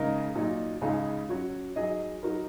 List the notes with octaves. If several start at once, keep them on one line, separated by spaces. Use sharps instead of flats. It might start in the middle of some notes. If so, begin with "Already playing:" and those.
Already playing: C#3 G#3 D#4 A#4 D#5
A#2 F#3 D#4
C#2 C#3 G#3 D#4
F#3 C#4 F#4 C#5
F#3 D#4 G#4 D#5
F#3 D#4 F#4 A#4